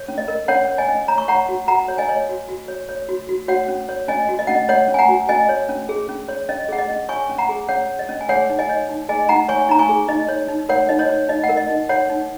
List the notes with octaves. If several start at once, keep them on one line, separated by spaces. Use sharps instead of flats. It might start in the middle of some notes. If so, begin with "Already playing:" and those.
Already playing: C#5
C#4
D#5
A#4
C#4 C#5 F#5
C#5
D#5 G#5
C#4
C#5 A#5
C#6
C#5 F#5 A#5
F#4
F#4 F#5 A#5
C#5
D#5 G#5
C#5
F#4
F#4
C#5
C#5
F#4
F#4
F#4 C#5 F#5
C#4
C#5
C#4 D#5 G#5
F#4
D#5
C#4 F#5
D#5
C#5 F#5
C#4
G#5
F#5 A#5
F#4
C#4 D#5 G#5
C#5
C#4
G#4
C#4
C#5
C#4 D#5
G#4 F#5
D#5
C#4
C#5 G#5 C#6
C#4
F#5 A#5
G#4
C#4 C#5 F#5
C#5
D#5
C#4
G#5
G#4 C#5 F#5
D#4
D#5 G#5
C#5
D#4
G#4 D#5 G#5
D#4 F#5 A#5
C#5 G#5 C#6
D#4 A#5
G#5 C#6
G#4
D#4 D#5
C#5
D#4
A#4 C#5 F#5
D#4 D#5
C#5
C#5
D#4 D#5
F#5
A#4
D#5
D#4
C#5 F#5
D#4